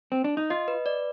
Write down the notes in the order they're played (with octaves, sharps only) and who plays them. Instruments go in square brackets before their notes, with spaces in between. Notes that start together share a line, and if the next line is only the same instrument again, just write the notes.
[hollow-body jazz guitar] C4
D4
D#4
[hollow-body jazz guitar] F4 [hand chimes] D#5
[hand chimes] B4
D5